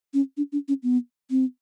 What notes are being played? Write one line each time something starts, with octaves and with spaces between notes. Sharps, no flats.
C#4
D4
D4
C#4
B3
C4